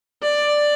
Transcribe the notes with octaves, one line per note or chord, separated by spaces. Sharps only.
D5